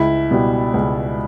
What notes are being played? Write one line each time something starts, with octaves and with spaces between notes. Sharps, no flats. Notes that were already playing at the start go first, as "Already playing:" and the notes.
Already playing: C#2 E4
B2 G3
C#2